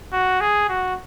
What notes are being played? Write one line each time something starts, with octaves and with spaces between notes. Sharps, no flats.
F#4
G#4
F#4